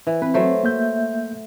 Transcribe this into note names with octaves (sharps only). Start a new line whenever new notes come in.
E3
C4 B4
F#3 A3 C5
A#3 E5 G6